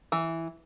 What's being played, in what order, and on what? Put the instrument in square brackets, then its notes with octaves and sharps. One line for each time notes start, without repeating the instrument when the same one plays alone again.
[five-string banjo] E3